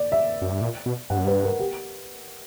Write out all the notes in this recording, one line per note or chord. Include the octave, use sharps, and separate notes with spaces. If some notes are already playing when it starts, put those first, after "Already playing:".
Already playing: D5
E5
F#2
G2
A#2
B2
G2 F#5
F#2
G2 B4
A#4
G4